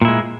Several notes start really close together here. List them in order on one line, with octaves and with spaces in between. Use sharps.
A#2 E4 G#3